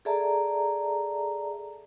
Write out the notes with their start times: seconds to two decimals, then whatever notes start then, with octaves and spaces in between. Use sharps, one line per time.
0.05 G#4 A4 D5 E5 A5 A#5